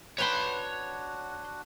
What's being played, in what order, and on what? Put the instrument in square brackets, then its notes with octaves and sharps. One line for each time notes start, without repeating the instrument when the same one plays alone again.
[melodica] D4 F#4 F#5 [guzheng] B4 G5 B5 [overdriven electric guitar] C#5 C6